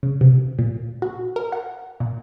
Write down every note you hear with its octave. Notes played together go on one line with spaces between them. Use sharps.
C#3
C3
A#2
F#4
A#4
F#5
A#2